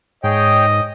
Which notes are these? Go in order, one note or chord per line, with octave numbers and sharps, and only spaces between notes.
G#2 G#4 C#5 D#5 G5